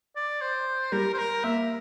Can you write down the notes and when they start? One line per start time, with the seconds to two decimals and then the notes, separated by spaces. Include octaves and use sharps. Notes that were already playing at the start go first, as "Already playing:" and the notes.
0.16 D5
0.42 C5
0.92 G3 A#4
1.14 C5
1.18 A#4
1.44 A#3 E5